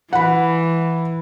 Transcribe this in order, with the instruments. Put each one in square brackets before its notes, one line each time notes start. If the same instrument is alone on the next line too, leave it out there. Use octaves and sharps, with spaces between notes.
[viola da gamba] E3 [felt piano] F#5 B5